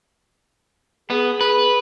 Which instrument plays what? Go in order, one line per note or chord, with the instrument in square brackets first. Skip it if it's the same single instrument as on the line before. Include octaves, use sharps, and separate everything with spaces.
[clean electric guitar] B3 [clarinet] G#4
[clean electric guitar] B4